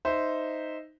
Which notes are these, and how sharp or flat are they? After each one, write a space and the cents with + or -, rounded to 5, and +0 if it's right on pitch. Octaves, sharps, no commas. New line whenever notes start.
D#4 +0 C5 -10 E5 +0